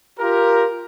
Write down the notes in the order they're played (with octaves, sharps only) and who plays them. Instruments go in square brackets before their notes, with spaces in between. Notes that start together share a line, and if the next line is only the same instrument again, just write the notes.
[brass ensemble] F4 G4 A#4